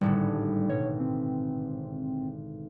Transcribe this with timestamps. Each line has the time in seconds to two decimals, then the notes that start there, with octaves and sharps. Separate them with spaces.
0.01 G#1 A2 D3 G3
0.69 B2 C#5
1.00 C4